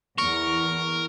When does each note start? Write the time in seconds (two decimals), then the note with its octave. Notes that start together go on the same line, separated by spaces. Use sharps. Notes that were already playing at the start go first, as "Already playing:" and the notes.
0.18 E2 A#4 C#6